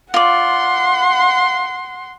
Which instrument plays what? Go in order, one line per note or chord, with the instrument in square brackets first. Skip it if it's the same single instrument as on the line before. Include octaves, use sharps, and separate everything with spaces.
[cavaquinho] F4 D5 [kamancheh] F#5 C6